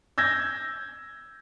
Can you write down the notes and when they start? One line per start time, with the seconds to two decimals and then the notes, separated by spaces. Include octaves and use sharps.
0.18 E6 G6 G#6 A#6